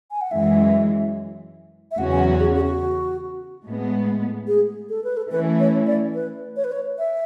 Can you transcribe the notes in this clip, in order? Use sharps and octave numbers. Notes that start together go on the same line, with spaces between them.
G#5
F#5
F#2 E3 G#3 E5
E5
E2 C#3 F#3 C#4 F#4 F#5
G#5
F#5
G#4
G#4
F#4
A2 G#3 B3
G#4
A4
B4
A4
E3 A3 C#4 E4 B4
C#5
D5
B4
C#5
B4
C#5
E5